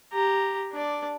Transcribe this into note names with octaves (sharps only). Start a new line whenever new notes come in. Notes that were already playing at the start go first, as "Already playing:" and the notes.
G4 A#5
D4 D5